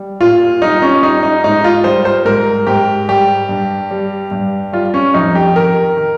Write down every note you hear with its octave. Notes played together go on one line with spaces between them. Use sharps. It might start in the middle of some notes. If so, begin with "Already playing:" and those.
Already playing: G3
A#2 F4
G3 D#4
C#4
G3 D#4
D#4
G#2 D#4
F4
G3 C5
C5
G#2 A#4
G#2 G4
G3 G4
G2
G3
G2
G3 F4
C#4
F2 D#4
G4
D#3 A#4
D#3